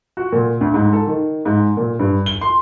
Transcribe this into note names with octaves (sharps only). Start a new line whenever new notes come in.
F#4
A#2
D2
G#2
A4
D#3
G#2
A#2
G2
G7
C6